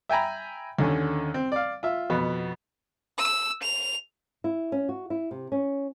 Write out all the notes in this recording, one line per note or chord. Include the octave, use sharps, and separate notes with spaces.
E5 G5 G#5 A#5 B5
D#2 D3 C#4
C4
D5 F5
F4 E5
F2 B2 B3
E6
F7
E4
C#4
F#4
E4
C3
C#4